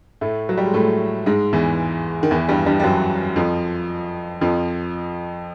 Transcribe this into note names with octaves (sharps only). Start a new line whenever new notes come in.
A2 A3
F#3
G3
G#3
A2 A3
G#2 G#3
E2 E3
D#3
E2 E3
G2 G3
G2 G3
G3
F#2 F#3
F2 F3
F2 F3